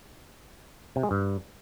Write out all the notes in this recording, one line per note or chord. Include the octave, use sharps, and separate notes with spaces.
C3
G#3
G2